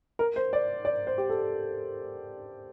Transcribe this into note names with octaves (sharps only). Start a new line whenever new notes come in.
A#4
C5
D5
D5
C5
G4
A4